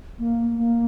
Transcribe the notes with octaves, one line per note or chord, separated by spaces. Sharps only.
A#3
A#3